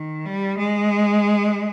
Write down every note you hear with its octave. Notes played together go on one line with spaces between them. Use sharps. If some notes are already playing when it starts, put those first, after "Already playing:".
Already playing: D#3
G3
G#3